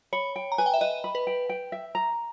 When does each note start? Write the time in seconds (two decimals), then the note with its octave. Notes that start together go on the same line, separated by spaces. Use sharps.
0.13 C#5 B5
0.36 G5
0.52 A#5
0.58 B4 G#5
0.66 G5
0.74 E5
0.81 B4 D#5
1.04 B5
1.15 B4
1.27 G5
1.49 G5
1.72 E5
1.95 A#5